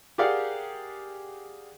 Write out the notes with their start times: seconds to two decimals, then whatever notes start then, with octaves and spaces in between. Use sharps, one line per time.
0.18 G4 G#4 A#4 D5 F5 F#5